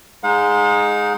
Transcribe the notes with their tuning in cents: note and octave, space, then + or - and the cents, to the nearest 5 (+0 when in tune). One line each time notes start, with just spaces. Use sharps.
G#3 +0 D#4 +0 F#5 -45